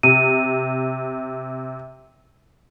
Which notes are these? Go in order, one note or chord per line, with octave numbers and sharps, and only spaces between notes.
C3 D#7